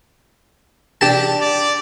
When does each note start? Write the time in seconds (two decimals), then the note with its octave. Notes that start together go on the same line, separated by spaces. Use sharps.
1.01 D4 G4 A5
1.41 D5